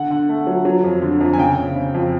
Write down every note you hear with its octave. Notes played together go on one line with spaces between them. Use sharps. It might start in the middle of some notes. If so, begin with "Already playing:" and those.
Already playing: D3 F#5
D3
A3
F#3
F#3
F2
D3
F2
G#5
C#3 G5
C#3
C#3
F2